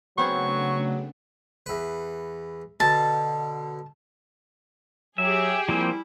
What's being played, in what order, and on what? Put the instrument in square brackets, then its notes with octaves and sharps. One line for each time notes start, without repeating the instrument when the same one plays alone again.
[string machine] C#3 A3 D4 [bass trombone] F#3 [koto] B3 C4 G#4 [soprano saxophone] C#6
[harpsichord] E2 B4
[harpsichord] B2 D3 [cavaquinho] A5
[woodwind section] F#3 [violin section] G4 G#4 [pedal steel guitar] E5
[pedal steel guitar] F3 A#3 C4 [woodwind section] G3 E4